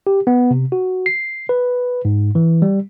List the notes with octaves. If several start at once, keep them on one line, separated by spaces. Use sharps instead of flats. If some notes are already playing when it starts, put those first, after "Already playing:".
G4
B3
C3
F#4
C7
B4
G#2
E3
G3